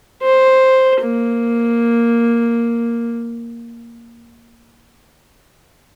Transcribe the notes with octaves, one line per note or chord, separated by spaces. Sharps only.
C5
A#3